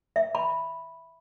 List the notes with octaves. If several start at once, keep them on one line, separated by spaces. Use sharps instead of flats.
E5
B5